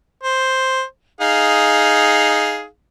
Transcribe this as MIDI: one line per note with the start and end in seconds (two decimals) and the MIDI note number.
0.23 0.83 72
1.21 2.65 63
1.21 2.65 68
1.21 2.65 77